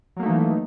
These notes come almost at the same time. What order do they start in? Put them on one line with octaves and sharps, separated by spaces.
F#3 A#3 A3 D#4 E3